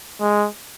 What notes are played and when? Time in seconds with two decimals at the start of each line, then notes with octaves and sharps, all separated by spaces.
0.20 G#3